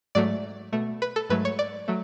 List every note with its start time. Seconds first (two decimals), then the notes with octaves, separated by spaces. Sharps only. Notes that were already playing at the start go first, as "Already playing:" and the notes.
0.15 G#2 F#3 A3 D5
0.72 B2 A3
1.02 B4
1.16 A4
1.30 G#2 F#3 A3 B4
1.45 C#5
1.59 D5
1.88 F#3 A3